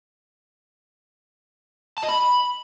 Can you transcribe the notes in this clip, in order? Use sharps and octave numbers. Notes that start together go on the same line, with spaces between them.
A5
D#5
B5